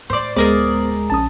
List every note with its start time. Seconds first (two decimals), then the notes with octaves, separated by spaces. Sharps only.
0.10 A2 C5 D5
0.36 D1 G#3 B3 G#4 A#4 C5 D5
1.10 A#1 C#4 A5 D#6